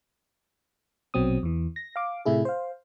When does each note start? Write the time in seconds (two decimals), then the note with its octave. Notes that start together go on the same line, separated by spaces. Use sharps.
1.14 A#1 B2 F#3 C4 D#6
1.43 E2 E3
1.76 A#6
1.96 F5 D6
2.25 A2 C3 A3 E4 G#4
2.45 C5 F5